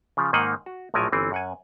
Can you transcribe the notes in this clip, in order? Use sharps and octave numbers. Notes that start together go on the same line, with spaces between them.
C#3 F3
G#2 D#3 A#3 D#4 D#5 F#5
F#4
A#1 A2 F3 F#3 A#4 G#5
G1 E3 C4
F#2 F#5 G#5